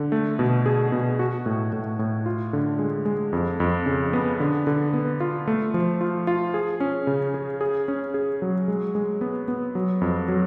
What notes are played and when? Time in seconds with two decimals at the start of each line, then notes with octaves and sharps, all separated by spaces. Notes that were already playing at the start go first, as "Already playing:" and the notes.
Already playing: D3
0.12 A3
0.39 B2
0.66 G#4
0.92 B2
1.19 F#4
1.46 A2
1.73 A2
1.99 A2
2.26 F4
2.53 D3
2.79 G#3
3.06 G#3
3.33 F2
3.60 F2
3.86 C#3
4.13 B3
4.40 D3
4.67 D3
4.94 B3
5.20 F4
5.47 A3
5.74 F3
6.01 F4
6.27 F4
6.54 G#4
6.80 C#4
7.07 C#3
7.34 G#4
7.61 G#4
7.88 C#4
8.14 G#4
8.42 F#3
8.68 G#3
8.95 G#3
9.21 B3
9.48 B3
9.75 F#3
10.01 F2
10.28 F#3